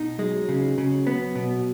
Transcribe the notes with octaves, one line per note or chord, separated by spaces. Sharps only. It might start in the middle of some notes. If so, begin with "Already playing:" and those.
Already playing: B2 D#4
F#3 G#3
C#3
C#3
B3
B2